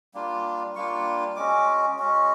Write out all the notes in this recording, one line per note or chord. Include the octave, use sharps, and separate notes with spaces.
G3 A#3 D4 F4
G3 A#3 D4 F4 C#6
G#3 C#4 F#4 D6
G#3 C#4 F#4